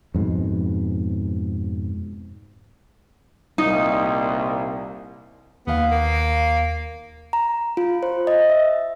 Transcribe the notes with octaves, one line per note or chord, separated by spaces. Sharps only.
F2 G#2 B2
C2 A#2 A#3 D#4
D#2 B3 F5
A#3
A#5
F4
C5
D#5
E5